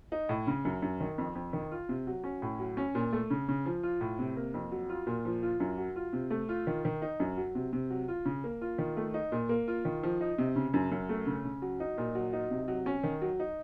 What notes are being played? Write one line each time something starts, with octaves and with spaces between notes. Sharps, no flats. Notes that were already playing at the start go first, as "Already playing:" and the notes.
D#4
A2
C#3
F#2
F#2
D#3
F2
F2
D#3
F4
C3
F#3
C#4
A2
F#3
C#4
A#2
A3
C#3
C#3
F3
F4
A2
C3
A#3
F2
F#3
F4
A#2
F3
F4
F#2
F#3
F4
C3
A3
F4
D#3
D#3
D#4
F#2
F#3
C3
C3
F#3
F4
C#3
A#3
F4
D#3
A3
D#4
A#2
A#3
F4
D#3
F3
D#4
C3
C#3
F#2
F#2
A3
C#3
C#3
F#3
D#4
A#2
F#3
D#4
C3
F#3
C#4
D#3
F#3
D#4